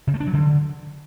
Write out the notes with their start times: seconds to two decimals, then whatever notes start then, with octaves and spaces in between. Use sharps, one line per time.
0.07 C#3
0.14 A3
0.20 D4
0.27 F#3
0.33 D3